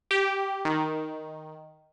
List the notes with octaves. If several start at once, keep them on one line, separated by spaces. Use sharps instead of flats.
G4
D#3